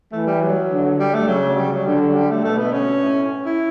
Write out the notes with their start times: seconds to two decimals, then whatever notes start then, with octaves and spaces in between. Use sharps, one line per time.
0.12 E3 A3
0.27 G3
0.42 F#3
0.71 D3
0.99 G3
1.14 A3
1.28 C#3 F#3
1.57 G3
1.72 F#3
1.86 D3 G3
2.01 F#3
2.15 G3
2.30 A3
2.44 B2 A3
2.58 B3
2.73 C#4
3.02 A2
3.45 E4